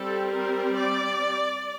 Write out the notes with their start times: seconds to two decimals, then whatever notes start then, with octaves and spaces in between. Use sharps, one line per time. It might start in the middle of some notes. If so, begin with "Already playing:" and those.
Already playing: G3 C4 A4
0.31 A#4
0.76 D5